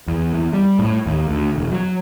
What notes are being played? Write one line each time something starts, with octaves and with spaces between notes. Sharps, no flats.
E2
E2
G3
A2
D#2
D2
E1
F#3